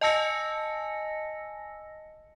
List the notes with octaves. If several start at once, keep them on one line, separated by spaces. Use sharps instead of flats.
D#5 G#5 A5 E6 A#6 C#7